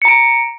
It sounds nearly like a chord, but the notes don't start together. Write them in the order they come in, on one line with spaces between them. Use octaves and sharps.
C#7 A#5 D7